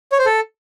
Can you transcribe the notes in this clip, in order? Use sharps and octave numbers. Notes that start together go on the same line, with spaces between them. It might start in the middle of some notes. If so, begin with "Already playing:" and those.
C#5
C5
A4